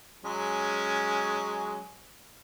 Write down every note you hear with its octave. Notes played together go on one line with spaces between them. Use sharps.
F#3 G#3 C#4